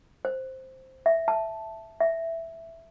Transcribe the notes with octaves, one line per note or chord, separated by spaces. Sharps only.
C5
E5
A5
E5